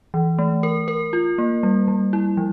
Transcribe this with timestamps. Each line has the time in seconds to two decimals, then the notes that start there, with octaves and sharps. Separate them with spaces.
0.14 E3
0.39 A3
0.63 A#4
0.88 A#4
1.13 F4
1.38 A#3
1.63 G3
1.88 G3
2.13 E4
2.37 F3